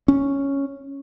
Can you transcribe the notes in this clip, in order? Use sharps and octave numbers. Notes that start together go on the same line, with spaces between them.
C#4